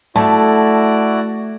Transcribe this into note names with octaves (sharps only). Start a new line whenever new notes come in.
A3 E4 F#4 D5 A5